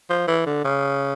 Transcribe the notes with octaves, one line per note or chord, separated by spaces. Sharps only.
F3
E3
D3
C#3